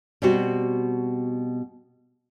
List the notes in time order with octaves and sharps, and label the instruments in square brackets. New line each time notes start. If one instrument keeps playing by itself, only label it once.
[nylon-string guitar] B2 G3 C4 F#4